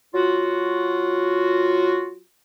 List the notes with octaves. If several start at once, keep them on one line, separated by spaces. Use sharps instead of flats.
F#3 F4 F#4